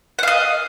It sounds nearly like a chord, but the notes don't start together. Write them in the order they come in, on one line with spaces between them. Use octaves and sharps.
F#5 F5 D#5